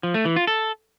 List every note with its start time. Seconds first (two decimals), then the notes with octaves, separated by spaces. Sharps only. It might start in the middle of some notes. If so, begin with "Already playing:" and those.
0.03 F3
0.14 A3
0.25 E3
0.36 F4
0.47 A4